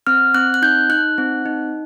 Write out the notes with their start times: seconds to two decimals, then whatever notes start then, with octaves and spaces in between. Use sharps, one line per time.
0.07 C4 F6
0.34 C4 F#6
0.54 F#6
0.62 D#4 G6
0.90 D#4 F#6
1.18 C4
1.46 D#4